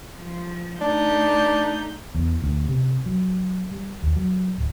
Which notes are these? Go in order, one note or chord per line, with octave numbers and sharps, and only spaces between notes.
F3
A3 D4 D#4 G6
E2
D2
C3
F#3
G3
D#2
F#3
D1